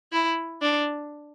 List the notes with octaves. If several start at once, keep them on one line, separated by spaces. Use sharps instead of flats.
E4
D4